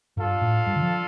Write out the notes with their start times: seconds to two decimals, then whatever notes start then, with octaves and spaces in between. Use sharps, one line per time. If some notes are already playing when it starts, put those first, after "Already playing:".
0.17 G2 D4 F4 A4 F5
0.41 A2
0.67 G2
0.76 D3
0.83 F3